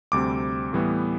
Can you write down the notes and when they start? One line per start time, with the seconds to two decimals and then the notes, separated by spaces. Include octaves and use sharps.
0.12 D2 C3 G3 C4 D6
0.73 A2 E3 G3 B3